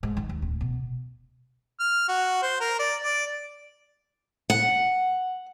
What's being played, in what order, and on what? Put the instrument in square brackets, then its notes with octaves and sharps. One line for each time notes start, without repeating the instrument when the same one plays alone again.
[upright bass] G#2
D#3
D#2
D1
B2
[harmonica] F6
F#4
C5
A#4
D5
D5
[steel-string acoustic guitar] F#5